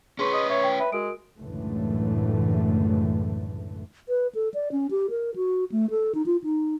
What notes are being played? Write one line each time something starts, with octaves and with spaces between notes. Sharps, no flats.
C#4 G#4 B4 C6 C#6
D#5
C#5 E5
G5
B4 E5
G#3 F#4 A#4 D7
C#2 F#2 A2 D3 E3 A3
B4
A4
D5
C#4
G4
A#4
F#4
A3
A4
D#4
F4
D#4